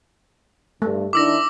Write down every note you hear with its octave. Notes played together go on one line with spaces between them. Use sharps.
G2 A3
D#3 D4 E4 D6 E6 A#6